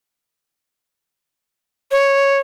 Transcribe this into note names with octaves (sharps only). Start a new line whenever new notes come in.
C#5